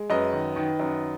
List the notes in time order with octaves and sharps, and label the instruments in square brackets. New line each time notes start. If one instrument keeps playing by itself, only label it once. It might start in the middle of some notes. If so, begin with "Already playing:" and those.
Already playing: [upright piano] G#3
F#2 B4 D#5
D#3
D#3
F#2